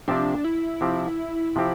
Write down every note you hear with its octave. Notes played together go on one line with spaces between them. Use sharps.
C3 F3 C4 D4 G4
E4
C3 F3 C4 G4
C3 F3 C4 G4